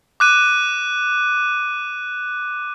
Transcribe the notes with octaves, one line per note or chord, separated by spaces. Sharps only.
D6 F#6 D#7